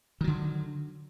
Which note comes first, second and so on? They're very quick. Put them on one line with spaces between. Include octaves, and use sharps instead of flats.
D#3 F#3 D3